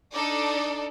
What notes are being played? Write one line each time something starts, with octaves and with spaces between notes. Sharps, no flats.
D4 D#4 A4 D5